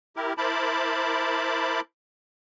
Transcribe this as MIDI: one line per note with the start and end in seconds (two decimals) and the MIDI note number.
0.16 0.33 64
0.16 0.33 67
0.16 0.33 70
0.38 1.81 64
0.38 1.81 70
0.38 1.81 72
0.38 1.81 81
0.38 1.81 83
0.38 1.81 86